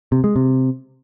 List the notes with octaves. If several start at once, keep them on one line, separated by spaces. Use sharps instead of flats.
C3
G#3
C3